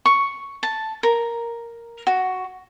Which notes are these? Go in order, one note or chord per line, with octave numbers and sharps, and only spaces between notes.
C#6
A5
A#4
F#4